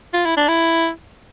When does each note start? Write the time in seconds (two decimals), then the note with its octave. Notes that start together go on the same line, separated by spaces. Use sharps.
0.14 F4
0.25 E4
0.37 D4
0.48 E4